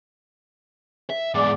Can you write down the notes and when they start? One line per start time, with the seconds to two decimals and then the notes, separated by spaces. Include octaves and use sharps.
1.10 E5
1.35 E2 G#2 D5